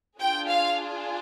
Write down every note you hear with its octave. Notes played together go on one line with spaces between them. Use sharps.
D4 F4 G#4 G5
F5